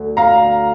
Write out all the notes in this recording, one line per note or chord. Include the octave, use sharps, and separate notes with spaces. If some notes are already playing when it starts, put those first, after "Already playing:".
Already playing: D2 D3
F5 A#5